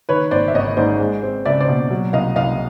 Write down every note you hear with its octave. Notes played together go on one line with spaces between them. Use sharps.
D#3 B4 C#5
G#1 C5 D5
E5
G#1 C#5 D#5
G#2 C5 D5
G#3
C4
C#2 D5 E5
C5 D5
B2
F#3
C2 D#5 F5
C2 D#5 F5